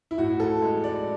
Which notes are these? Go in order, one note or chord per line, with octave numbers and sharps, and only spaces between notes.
E4
A2 F#4
A4
G#3
D5